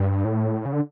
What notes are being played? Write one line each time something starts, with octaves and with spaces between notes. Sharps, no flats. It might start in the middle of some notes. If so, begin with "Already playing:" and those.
Already playing: G2
A2
C#3
D3